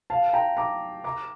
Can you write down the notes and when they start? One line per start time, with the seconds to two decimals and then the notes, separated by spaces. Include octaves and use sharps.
0.10 F5 A5
0.33 G5 A#5
0.57 A#5 D6
1.04 A#5 D6